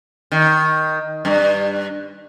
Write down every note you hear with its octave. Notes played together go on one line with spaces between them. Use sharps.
D#3
G2